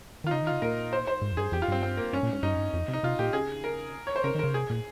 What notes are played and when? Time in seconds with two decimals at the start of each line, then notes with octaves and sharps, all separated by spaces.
0.24 D#3 F4
0.31 C#3 D#4
0.42 D#3
0.47 C#3 F4
0.62 A#2 A#4
0.93 C5
1.07 C5
1.22 G#2
1.32 F2
1.37 G2 G#4
1.52 F2 G4
1.62 F4
1.68 G2 C4
1.83 C4
1.97 A#3
2.13 G2 C#4
2.23 A#2
2.33 G#2
2.43 G2 D#4
2.55 F2
2.58 G2
2.73 F2
2.88 C3
2.93 D#4
3.03 C3 F4
3.19 A#2 G4
3.33 C#3 G#4
3.64 A#4
4.07 C#5
4.16 C5
4.24 C#3 A#4
4.35 D#3
4.39 C#3 A#4
4.54 C3 G#4
4.70 A#2